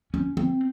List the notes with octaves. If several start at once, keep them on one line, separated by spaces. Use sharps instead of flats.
C#4
C4